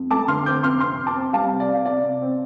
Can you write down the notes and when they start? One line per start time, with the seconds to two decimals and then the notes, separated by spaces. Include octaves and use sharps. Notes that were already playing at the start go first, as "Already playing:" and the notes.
Already playing: F2
0.11 A3 A5 D6
0.28 D3 C6 F6
0.46 C4 D6 G6
0.63 F2 C6 F6
0.80 C3 C6 F6
0.99 C3
1.07 A5 D6
1.16 C4
1.33 G3 F5 A5
1.51 C3
1.60 D5
1.69 C3 F5
1.85 C3 D5
2.04 C3
2.22 C4